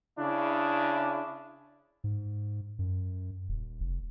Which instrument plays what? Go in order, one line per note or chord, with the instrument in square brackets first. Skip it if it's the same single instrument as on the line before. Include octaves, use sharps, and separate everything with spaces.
[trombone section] C#3 D4 E4
[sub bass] G#2
F#2
D#1
F1